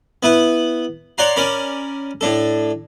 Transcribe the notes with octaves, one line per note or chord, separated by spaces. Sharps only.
B3 E4 B4
C#5 D5 F#5 A#5 C6
C#4 A#4 D5 B5
A2 D4 A4